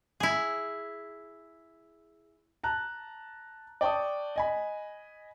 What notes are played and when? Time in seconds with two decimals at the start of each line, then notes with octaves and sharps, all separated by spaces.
0.20 E4 G#4
2.64 A5 A#5 F#6
3.81 D5 G5 A5 C#6 D#6
4.36 D#5 G#5 B5